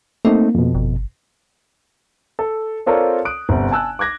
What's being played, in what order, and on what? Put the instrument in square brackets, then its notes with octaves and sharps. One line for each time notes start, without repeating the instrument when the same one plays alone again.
[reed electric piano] A3 C4 D#4 [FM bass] A#3
[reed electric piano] F2 B2
[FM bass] G1
[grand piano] A4
C4 F4 A4 A#4 C#5 D5
D#6 F#6 D7
G1 C3
G#5 A5 E6 F#6
D6 F#6 G#6 A#6